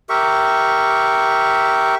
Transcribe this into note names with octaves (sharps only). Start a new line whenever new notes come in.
G4 A#4 E5 C#6